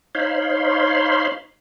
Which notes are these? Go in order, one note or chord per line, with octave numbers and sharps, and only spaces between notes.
D#4 C5 C#5 F5 B5 C6